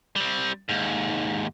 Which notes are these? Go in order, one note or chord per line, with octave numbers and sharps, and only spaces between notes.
G3 C4
D#2 G#2